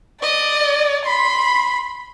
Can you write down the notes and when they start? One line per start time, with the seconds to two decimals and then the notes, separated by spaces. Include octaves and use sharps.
0.22 D5 D#5
1.05 B5 C6 B6